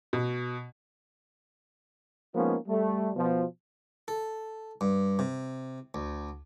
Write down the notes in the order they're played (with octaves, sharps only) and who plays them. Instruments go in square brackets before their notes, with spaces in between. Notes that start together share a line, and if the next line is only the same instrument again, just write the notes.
[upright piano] B2
[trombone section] F3 G#3 A#3 B3 C#4 D#4
G3 A3
B2 F3
[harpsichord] A4
G2
C3
D2